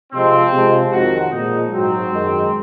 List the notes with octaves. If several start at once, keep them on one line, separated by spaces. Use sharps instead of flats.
C3 F3 G#3 C4
C3 F3 G#3
F2 D#3 F#3 F#4
A#2 F3 G#3 D#4
G#2 F#3 C4
F#2 D#3 G#3